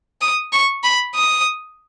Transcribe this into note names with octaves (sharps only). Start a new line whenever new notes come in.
D#6
C#6
B5
D#6